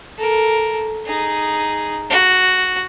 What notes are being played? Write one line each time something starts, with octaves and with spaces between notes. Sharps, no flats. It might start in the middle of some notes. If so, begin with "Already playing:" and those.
A4 A#4
D#4 G#4
F#4